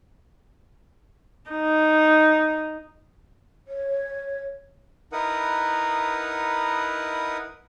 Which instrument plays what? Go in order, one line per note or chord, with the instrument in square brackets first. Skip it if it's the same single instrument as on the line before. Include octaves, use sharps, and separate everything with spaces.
[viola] D#4
[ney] C#5
[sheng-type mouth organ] D#4 E4 A#4 B4 F#5 D#6